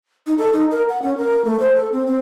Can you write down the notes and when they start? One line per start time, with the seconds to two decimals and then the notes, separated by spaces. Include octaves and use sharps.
0.27 D#4
0.38 A4
0.53 D#4
0.71 A#4
0.89 F#5
1.02 C#4
1.18 A#4
1.45 A3
1.60 C5
1.76 A4
1.92 C4
2.07 C4